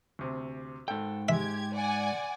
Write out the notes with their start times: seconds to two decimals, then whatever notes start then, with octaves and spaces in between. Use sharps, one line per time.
0.19 D2 C3
0.88 G#2 A4 G5
1.29 G#3 G4 E5 G#6
1.73 D5 F#5 G#5